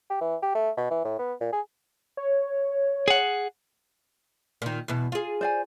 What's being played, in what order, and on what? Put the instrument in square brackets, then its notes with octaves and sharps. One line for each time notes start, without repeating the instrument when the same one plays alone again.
[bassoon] G4
E3
G4
A3
B2
E3
A2
B3
A#2
G#4
[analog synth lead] C#5
[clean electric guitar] G#4 F#5
[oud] A#2 D#3
E2 B2
F4 G#4
[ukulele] C5 D5 G#5